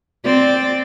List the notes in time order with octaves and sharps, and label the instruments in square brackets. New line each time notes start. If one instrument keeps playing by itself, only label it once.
[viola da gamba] C4 D5